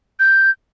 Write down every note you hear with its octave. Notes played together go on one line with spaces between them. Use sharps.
G6